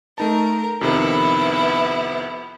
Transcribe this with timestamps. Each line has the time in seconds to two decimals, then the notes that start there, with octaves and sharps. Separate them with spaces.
0.18 A3 D#4 A#4 A5
0.81 F2 C3 D#3 B3 E4